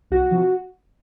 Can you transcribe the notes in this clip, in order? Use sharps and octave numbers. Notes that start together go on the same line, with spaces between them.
C2 F#4
C3 F3